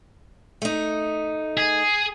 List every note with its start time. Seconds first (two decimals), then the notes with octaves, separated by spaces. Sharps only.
0.62 A3 D#4
1.57 G#4